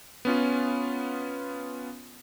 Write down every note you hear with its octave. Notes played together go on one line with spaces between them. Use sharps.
B3 C#4 F4